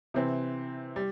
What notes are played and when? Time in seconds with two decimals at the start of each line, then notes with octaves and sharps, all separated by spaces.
0.14 C3 E3 C4
0.96 G3